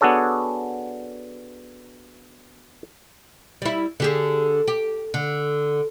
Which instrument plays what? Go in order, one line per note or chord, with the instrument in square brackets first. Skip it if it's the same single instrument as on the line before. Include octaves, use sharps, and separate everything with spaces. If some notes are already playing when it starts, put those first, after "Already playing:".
[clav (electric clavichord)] B3 D4 F#4 G#4 A4 C#5
[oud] G3 E4
D3 G4 G#4
G4
D3